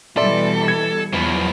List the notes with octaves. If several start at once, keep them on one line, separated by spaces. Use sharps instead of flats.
B2 E3 G3 A4 D5 E5 C6
G#6 C#7
E2 F3 F#3 B3